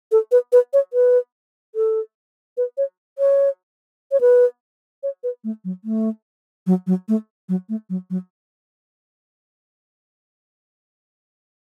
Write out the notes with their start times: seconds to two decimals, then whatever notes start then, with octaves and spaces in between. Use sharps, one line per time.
0.12 A4
0.32 B4
0.52 B4
0.73 C#5
0.93 B4
1.75 A4
2.57 B4
2.78 C#5
3.19 C#5
4.12 C#5
4.21 B4
5.03 C#5
5.24 B4
5.44 A3
5.65 F#3
5.85 A3
6.67 F#3
6.87 F#3
7.09 A3
7.49 F#3
7.69 A3
7.90 F#3
8.10 F#3